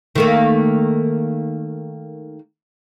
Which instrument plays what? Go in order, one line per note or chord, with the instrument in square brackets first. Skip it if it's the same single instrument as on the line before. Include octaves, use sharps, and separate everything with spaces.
[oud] D#3 A3 A#3